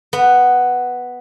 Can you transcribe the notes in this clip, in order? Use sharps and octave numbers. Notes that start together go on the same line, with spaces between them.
B3